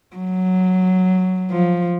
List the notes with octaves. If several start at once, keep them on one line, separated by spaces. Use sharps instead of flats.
F#3
F3